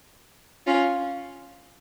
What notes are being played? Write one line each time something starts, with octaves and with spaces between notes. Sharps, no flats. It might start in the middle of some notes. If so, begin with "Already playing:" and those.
C#4 F4